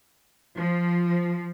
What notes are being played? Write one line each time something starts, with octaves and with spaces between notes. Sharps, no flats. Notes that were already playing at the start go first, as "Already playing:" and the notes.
F3